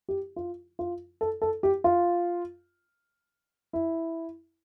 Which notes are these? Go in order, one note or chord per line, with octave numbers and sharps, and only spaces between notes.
G4
F4
F4
A4
A4
G4
F4
E4